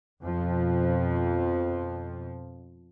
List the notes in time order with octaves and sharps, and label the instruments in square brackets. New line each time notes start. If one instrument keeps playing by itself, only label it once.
[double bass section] F2 B2 F3